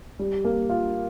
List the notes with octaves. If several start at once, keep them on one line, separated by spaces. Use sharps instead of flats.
G3
A#3
F4